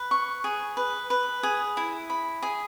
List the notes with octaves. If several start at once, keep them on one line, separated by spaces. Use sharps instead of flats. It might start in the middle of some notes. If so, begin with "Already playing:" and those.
Already playing: B4
C#6
G#4
B4
B4
G#4
E4
B5
G#4